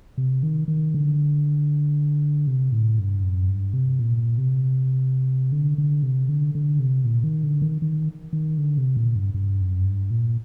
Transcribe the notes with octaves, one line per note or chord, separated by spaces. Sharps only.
C3
D#3
D#3
D3
C3
A2
G2
F#2
G2
C3
A#2
C3
D3
D3
C3
D3
D3
C3
A#2
D#3
D3
D#3
D#3
D#3
D3
C3
A#2
G2
G2
F#2
G2
A#2